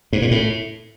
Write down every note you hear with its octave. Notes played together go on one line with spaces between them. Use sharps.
G#2
A#2
A2